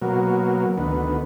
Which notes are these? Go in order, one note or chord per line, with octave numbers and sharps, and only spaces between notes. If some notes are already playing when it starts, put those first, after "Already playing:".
B2 F#3 A#3
D2 D#3 B3